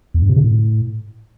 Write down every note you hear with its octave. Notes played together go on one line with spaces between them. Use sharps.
E2
G2
C3
C#3
A2